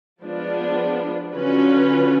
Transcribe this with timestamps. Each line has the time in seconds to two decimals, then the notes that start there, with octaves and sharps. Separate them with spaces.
0.22 F3 G#3 B3 D4 F4
1.34 D3 F#3 C#4 F4 B4